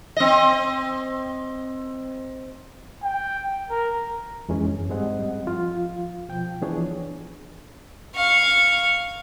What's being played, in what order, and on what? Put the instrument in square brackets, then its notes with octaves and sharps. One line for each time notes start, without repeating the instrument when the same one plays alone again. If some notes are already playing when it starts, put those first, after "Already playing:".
[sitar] C4 D#5
[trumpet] G5
A#4
[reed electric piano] F2 E3 G#3 C#4 G#4
F#2
G#2 G3 C4 G#4 D#5 F#5
F3 F4 F5
B2 F3 G5
E3 F3 B3 D4 G#4 C#5
[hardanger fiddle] F5 C#6